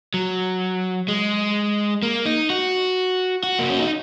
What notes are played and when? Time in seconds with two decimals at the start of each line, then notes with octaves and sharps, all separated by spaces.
0.14 F#3
1.08 G#3
2.03 A#3
2.26 D#4
2.50 F#4
3.43 F#4
3.59 A#3
3.69 C#4
3.80 D#4